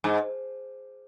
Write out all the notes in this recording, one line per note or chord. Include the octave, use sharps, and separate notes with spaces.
G#2